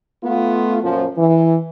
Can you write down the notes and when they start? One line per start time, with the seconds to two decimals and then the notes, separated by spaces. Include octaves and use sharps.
0.23 A3 B3 F4
0.82 F#2 A#2 F3
1.17 E3